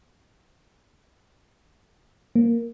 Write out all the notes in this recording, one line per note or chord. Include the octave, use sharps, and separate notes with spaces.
A#3